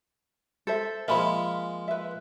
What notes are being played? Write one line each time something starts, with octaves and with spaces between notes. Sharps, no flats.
A4 C5 E5
F3 G#3 A#3 E5 G#5 B5
B4 E5